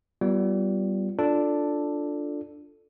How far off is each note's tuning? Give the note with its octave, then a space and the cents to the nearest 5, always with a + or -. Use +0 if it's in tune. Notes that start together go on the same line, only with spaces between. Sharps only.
G3 -20 B3 +0 F4 -15
D4 +0 F4 +0 A4 +0